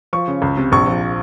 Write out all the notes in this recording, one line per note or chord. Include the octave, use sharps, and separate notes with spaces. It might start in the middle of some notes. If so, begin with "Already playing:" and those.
F3 C#6
C#3
C#2
C3
A#1 C#6
F3